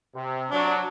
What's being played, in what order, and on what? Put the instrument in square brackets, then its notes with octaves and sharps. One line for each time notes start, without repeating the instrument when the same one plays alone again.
[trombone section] C3
[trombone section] F#3 [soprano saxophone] D4